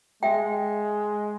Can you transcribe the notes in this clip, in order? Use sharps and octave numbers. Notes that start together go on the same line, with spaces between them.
G#3 E5 G5